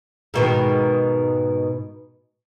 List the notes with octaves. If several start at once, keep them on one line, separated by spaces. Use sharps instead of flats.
G#2 B2 D#3